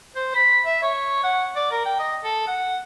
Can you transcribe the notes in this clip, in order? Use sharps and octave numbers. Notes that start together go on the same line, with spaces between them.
C5
B5
E5
C#5
F#5
D5
A#4
G5
D#5
A4
F#5